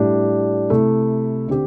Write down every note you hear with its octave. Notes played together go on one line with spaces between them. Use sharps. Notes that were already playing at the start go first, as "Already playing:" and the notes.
Already playing: A2 G3 D4 G4
C3 A3 E4 A4
D3 C4 G4